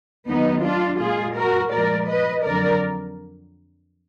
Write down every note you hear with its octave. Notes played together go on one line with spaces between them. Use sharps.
D#2 D#3 F#3 B3 D#4
D4 F4
A#2 G#3 F4 G#4
F#4 A#4
A#2 F3 G#3 A#4 D5
B4 D#5
F2 D3 F#3 A#4 D5